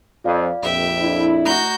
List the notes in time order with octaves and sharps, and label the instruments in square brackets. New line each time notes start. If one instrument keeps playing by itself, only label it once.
[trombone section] F2 [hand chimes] F4 D5 F5
[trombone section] A#1 F2 [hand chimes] G4 [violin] E5 G5
[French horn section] D4 E4
[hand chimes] A3 A#5 A#6 [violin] F#4 G6